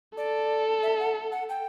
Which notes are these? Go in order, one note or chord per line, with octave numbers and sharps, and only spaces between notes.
A4 D5
E5
F#5
F#5
G5